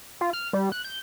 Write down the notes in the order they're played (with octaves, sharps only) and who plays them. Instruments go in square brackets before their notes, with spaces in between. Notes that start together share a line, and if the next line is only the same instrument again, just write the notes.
[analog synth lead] F4
F6
G3
F#6
G6